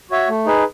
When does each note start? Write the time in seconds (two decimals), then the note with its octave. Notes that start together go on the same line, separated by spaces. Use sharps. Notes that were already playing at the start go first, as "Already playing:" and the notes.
0.11 F#4 C#5 E5
0.29 A3
0.46 D#4 G#4 B4